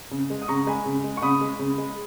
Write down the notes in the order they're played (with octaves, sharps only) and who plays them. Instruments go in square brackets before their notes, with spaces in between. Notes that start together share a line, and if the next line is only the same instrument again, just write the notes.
[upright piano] C#3
G#3
D#6
C#3 A#5 C#6
G#3 G#5 B5
C#3
G#3
C#6
C#3 B5 D#6
G#3
C#3
G#3